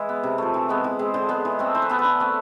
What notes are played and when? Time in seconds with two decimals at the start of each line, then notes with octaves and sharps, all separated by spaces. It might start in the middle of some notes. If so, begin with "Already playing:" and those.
Already playing: E3 G#3 E4 G#4
0.09 B3
0.23 C3
0.38 F3 A3
0.54 E3
0.69 G#3 B3
0.84 E3
0.99 G#3 C4
1.14 D3 C5
1.29 G#3 B3
1.45 E3
1.59 A3 C4
1.75 E3 C5
1.82 B4
1.90 B3 A4
1.99 B4
2.04 D3
2.20 A3 C4